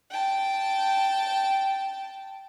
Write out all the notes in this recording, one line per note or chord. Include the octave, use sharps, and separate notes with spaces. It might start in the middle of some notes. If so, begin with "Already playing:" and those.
G5 A5